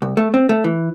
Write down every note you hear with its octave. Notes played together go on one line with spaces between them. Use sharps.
C2
A3
C4
A3
E3